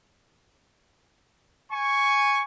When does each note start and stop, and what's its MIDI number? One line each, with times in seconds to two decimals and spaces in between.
1.72 2.41 80
1.72 2.41 85